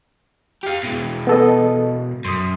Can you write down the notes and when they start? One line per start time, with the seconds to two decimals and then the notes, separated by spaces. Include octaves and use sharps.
0.63 G4 F5
0.84 B2 G#3
1.27 B3 A4 D#5
2.25 F#2 C6 D#6